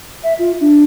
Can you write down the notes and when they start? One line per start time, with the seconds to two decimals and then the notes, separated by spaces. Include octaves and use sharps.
0.24 E5
0.39 F4
0.61 D4